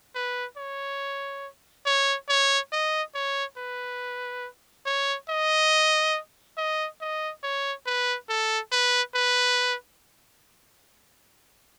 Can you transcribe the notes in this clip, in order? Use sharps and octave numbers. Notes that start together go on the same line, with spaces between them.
B4
C#5
C#5
C#5
D#5
C#5
B4
C#5
D#5
D#5
D#5
C#5
B4
A4
B4
B4